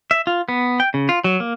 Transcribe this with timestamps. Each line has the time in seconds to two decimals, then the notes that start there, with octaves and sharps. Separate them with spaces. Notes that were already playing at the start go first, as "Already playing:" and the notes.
0.11 E5
0.27 F4
0.49 B3
0.80 G5
0.94 C#3
1.09 F4
1.24 F#3
1.40 A#3